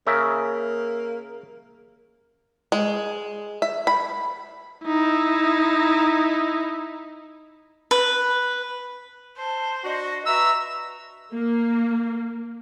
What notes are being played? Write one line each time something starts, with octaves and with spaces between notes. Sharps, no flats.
C#3 A#3 A#4 E5
G#3
E5
B5
D#4 E4
B4
C5 A5
D4 F#4 D#5
F#4 B4 E5 A#5 E6
A#3